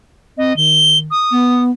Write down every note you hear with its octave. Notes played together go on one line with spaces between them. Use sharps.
C4 D#5
D#3 G7
D#6
B3